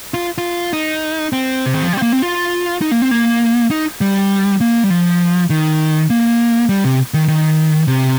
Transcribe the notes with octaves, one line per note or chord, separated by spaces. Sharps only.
F4
F4
D#4
C4
C3
D#3
F3
G3
C4
A#3
C4
F4
D#4
A#3
C4
A#3
D#4
G3
A#3
G3
F3
D#3
A#3
G3
C3
D#3
D#3
C3